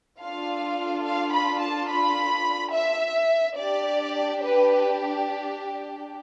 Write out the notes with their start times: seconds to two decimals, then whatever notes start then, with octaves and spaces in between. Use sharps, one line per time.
0.20 D4 F4 A4 F5
1.04 F5
1.33 B5
1.61 A5
1.89 B5
2.73 E5
3.57 D4 G4 D5
4.42 B4